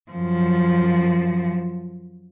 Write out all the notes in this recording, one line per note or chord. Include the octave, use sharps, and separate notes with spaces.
F#2 F3